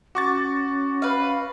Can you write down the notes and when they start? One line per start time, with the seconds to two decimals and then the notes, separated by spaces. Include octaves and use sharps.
0.15 C#4 F#4 C#6 D6 A6
1.02 B4 F5